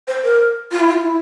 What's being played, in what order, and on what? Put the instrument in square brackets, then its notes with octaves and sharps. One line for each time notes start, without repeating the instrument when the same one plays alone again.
[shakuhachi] C5
A#4
F4
E4
F4
E4